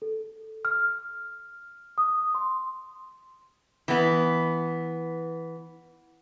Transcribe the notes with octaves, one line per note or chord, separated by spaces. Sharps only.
A4
F6
D#6
C6
E3 B3